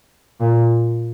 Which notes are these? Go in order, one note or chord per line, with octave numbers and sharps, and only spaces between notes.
A#2